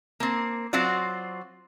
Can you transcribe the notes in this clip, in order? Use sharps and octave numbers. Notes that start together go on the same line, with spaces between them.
A#3 C4
F#3 C4 F4 F#4 D5